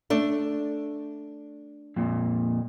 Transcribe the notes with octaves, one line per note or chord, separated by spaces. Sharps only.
A3 D4
F2 A#2